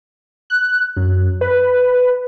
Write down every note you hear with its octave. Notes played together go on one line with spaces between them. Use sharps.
F#6
F#2
B4